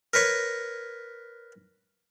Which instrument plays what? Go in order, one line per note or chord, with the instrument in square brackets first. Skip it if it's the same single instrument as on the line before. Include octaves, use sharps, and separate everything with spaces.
[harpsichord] A#4 B4 C#5